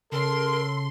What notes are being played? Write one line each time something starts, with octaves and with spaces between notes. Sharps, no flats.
C#3 A4 A#4 C6